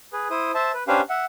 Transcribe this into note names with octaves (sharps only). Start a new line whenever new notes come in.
G#4 B4
E4 C5 D#6
C5 E5 A5
B4
C#4 D4 G4 B4 C5 F5
E5 F#5